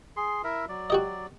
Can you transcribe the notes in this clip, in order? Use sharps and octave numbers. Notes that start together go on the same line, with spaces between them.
G#4 C6
E4 A#4 E5
F#3 D5
F#4 G4 D#5